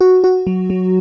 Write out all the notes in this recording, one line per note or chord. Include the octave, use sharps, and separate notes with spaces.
F#4
F#4
F#3
F#3